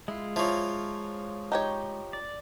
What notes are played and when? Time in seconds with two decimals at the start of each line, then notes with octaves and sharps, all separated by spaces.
0.08 G#3 E4 F4
0.36 F3 F#3 E4
1.52 D#4 G4 C#5
2.13 D5